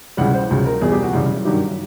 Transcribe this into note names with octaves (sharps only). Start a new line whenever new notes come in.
C#2 C#3 E3 G3 F#5
C5
C#2 C#3 F#3
A#4
E2 B2 G3 G#4
G4
F#4
F#2 C#3 E3 G3
G2 D#3 F#3 G4